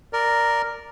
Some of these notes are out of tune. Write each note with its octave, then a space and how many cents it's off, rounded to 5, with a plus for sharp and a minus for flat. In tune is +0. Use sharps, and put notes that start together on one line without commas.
A#4 +0 D5 +0